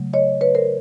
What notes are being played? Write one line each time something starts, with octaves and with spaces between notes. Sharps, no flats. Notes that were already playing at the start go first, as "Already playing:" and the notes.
Already playing: C#3 F#3 A3
C#5 D#5
B4 C#5
A#4 C5